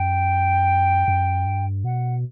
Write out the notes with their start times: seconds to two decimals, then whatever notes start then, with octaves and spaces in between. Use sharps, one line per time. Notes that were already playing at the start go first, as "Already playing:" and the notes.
Already playing: F#2 G5
1.08 F#2
1.46 G2
1.84 B2 F#5